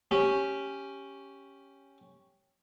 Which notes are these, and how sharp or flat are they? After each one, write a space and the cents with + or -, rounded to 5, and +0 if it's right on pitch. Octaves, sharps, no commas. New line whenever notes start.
C#4 +0 G4 +0